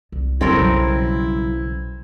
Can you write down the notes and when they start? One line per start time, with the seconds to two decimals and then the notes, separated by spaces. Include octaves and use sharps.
0.12 C2
0.41 F#2 C#3 G3 C4 C#4 E4 A4 A#4
0.56 B1